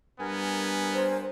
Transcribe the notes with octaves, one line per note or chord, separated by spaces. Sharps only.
G2 B3 A#4 G#5
C5